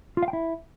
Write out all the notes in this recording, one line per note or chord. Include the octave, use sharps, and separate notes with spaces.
F4
F5
G5
E4